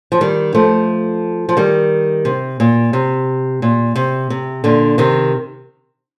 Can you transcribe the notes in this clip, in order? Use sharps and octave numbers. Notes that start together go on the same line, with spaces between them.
F3
D#3 G3
F3 A3
F3
D#3 G3
C3
A#2
C3
A#2
C3
C3
A#2 D3
C3 D#3